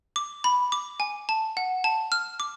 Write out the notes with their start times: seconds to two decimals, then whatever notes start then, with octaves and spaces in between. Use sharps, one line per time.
0.16 D6
0.44 B5
0.72 D6
1.00 G#5
1.29 A5
1.57 F#5
1.84 A5
2.12 F6
2.40 D6